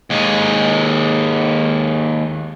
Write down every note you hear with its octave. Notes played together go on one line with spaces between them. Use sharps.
D#2 G#3